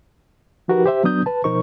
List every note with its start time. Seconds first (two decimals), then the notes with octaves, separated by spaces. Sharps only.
0.68 F3 D#4 F#4 G4 A#4 B4
0.86 G4 C5 E5
1.04 F#3 B3 D4 D#6 G6
1.26 B4 A5
1.44 B2 F3 D#4 A#4 C5 C#6